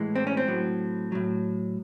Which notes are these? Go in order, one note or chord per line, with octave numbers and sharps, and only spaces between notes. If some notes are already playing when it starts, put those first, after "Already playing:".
Already playing: A2 E3 G#3
C4
C#4
C4
A2 F#3
A2 F#3